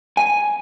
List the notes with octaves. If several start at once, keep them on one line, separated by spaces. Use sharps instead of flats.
G#5